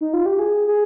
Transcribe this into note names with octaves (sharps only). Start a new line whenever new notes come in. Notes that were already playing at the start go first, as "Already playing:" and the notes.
D#4
F4
G4
G#4
G#4